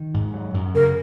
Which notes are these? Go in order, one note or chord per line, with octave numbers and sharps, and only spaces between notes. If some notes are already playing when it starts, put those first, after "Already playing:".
Already playing: D#3
G#2
F#3
F#2
C#3 A#4